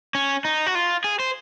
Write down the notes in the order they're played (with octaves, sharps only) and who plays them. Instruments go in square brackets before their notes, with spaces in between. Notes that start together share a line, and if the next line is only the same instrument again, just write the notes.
[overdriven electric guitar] C#4
D#4
F#4
F4
G#4
C5